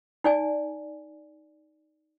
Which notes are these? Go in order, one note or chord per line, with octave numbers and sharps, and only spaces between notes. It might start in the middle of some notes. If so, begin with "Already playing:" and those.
D#4 D5 G#5